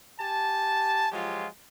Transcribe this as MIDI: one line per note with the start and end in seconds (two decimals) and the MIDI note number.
0.20 1.08 67
0.20 1.08 80
0.20 1.08 81
1.12 1.46 53
1.12 1.46 54
1.12 1.46 56
1.12 1.46 65
1.12 1.46 67